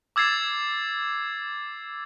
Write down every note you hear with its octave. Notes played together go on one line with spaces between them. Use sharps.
D6 E6 G#6 A6 C7